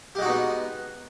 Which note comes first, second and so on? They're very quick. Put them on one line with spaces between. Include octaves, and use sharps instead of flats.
G4 G#3 F#4 D#4 B3